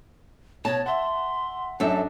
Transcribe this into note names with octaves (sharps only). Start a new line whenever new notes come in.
B2 C#5 A5
E5 F#5 C6
F#2 D4 D#4 A4 E5 A5